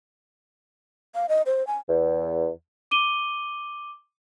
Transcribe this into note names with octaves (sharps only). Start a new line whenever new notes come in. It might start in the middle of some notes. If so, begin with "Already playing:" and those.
F5
D#5
C5
G#5
E2
D6 D#7 G7